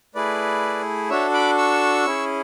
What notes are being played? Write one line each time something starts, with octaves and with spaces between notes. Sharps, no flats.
A3 E4 G#4 B4 D5
D4 F#4 A4 C#5 E5
B5 D6
C#6 E6
C#4 E4 G#4